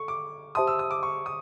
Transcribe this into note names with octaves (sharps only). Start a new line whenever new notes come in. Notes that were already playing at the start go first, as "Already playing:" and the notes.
Already playing: A4 C#6
D6
G4 C5 E5 A5 C6 D#6
E6
D#6
D6
C#6
D#6